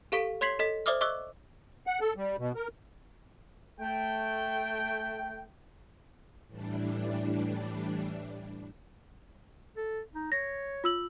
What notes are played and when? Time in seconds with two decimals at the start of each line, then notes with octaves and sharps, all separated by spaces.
0.12 G4 A4 F5 C#6 B6 D7
0.41 C#5 C6 G#6 B6 C7 F#7
0.59 A4 D#5 B6
0.86 C5 D5 E5 D6 D#6 F6
1.01 D#5 C#6 D6 E6 F#6
1.87 F#5
2.01 A4
2.16 G3
2.38 B2
2.56 A#4
3.80 A3 G5
6.47 A2 E3 G3 D4
9.77 A4
10.15 D#4
10.32 C#5 A#6
10.84 F4 E6 F#7